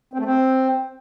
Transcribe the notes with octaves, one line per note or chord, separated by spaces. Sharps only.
C4
A3
C4